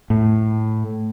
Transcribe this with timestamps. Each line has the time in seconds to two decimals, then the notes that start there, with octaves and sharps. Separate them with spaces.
0.10 A2